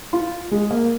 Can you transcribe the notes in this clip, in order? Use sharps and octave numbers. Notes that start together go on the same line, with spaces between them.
F4
G#3
A#3